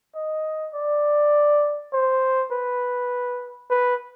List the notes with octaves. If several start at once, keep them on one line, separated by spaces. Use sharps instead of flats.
D#5
D5
C5
B4
B4